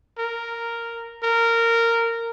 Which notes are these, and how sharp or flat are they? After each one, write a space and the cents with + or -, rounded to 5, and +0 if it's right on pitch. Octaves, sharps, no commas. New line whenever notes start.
A#4 -5
A#4 -15